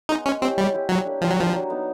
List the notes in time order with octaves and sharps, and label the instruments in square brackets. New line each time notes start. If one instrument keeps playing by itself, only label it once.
[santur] G#3 B3 [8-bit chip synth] D#4
[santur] G#3 [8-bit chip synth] C#4
[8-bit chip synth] C4 [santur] C#4 E4 G4
[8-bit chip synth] G3 [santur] G#3
[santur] C#4 E4 G4
[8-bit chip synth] F#3 [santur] G3
[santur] A#3 D4
[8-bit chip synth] F3 [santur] G3
[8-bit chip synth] F#3
[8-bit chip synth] F3 [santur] A#3 D4
[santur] F#3
B3 D#4